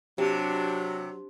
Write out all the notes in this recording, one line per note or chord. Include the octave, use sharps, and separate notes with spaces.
C3 F#3 D4 G4